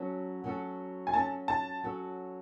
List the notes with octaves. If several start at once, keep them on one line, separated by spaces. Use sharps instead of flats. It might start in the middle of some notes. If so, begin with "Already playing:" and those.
Already playing: F#3 C#4 F#4 A4
F#3 C#4 F#4 A4
G#5
F#3 C#4 F#4 A4 A5
A5
F#3 C#4 F#4 A4